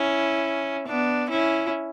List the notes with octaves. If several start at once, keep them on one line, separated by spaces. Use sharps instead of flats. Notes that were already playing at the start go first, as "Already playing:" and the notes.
Already playing: C#4 E4
B3 D4
C#4 E4